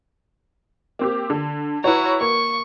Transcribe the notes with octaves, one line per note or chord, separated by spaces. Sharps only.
A#3 C4 G4
D3
E4 F#4 B4 C#5 A#5
A#3 C#6